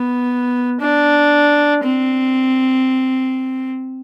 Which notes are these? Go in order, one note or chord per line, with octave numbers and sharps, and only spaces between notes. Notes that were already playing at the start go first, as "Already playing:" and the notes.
Already playing: B3
D4
C4